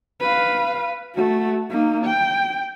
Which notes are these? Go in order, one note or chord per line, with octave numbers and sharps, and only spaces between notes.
B4 F5
A3 F#4
A#3 D#4
G5